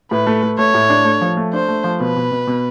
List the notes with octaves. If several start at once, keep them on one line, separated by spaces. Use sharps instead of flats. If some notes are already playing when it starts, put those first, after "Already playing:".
A2 B4
A3
A3
A3 C#5
A2
D4
A3
F3
A3
D4 C5
A3
F3
B2 B4
B2
B2
B2